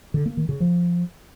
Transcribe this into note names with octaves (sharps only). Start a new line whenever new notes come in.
D3
A#3
D#3
C#3
F3